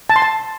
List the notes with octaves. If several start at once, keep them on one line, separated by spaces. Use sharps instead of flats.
A5
C6
A5